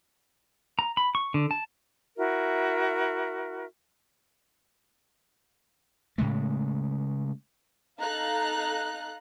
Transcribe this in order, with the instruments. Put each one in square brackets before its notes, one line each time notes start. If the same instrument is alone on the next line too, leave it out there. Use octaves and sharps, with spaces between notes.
[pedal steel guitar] A#5
B5
C#6
D3
A5
[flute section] E4 F#4 A#4 E5
[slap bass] A2 C#3 G#3 A3
[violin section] D#4 A4 F5 A#5 F#6